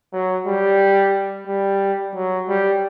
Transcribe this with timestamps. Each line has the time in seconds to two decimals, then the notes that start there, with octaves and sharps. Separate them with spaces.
0.13 F#3
0.47 G3
1.47 G3
2.15 F#3
2.48 G3